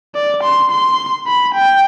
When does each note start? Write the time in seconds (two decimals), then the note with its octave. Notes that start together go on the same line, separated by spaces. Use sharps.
0.15 D5
0.43 C6
0.71 C6
1.27 B5
1.54 G5